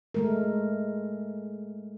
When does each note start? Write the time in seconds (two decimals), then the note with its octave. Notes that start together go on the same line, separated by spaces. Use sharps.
0.14 G#3 A3 A#4